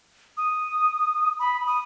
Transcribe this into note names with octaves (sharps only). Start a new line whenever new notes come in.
D#6
B5
D#6